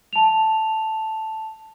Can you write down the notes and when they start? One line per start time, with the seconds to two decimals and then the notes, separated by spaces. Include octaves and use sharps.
0.13 A5 F7